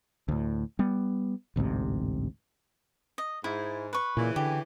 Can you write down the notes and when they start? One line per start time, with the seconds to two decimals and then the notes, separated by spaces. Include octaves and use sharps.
0.28 D2 A2
0.79 G3 B3
1.56 A1 D2 G#2 C3
3.18 D#5
3.44 G#2 E4
3.93 B4 C#6
4.17 A#2 C#3 E3
4.36 D3 G4